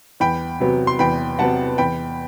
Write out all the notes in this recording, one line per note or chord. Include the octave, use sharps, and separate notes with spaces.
E2 G5 B5
C3 F#3 B3
C6
E2 G5 B5
C3 F#3 B3 F#5 A5
E2 G5 B5